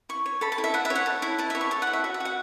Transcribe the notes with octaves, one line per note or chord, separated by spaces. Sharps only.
E4 C#6
C#5
A4 B5
A5
E4
E5
E4 F#5
E5
C#5
F#5
A4
E4
E4 A5
E5
C#5
C#6
A4 E5
F#5
E4
E5
F#4 E5
E5
F#4 F#5